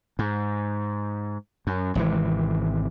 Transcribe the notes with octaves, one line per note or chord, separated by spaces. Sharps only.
G#2
F#2
G#1 C3 E3